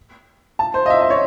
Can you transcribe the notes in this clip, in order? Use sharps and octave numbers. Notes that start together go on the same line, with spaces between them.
A5
C5
D#5
E5
D#5
C#5